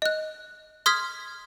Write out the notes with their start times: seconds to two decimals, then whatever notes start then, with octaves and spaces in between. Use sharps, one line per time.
0.02 D#5 F#6
0.86 C6 D#6 F6 G#6 B6